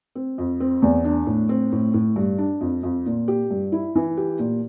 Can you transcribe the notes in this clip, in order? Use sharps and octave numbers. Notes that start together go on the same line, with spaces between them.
C4
F2
C4
E2
D4
A2
C4
A2
A2
G2
D4
F2
F2
A#2
G4
G2
E4
E3
G4
A#2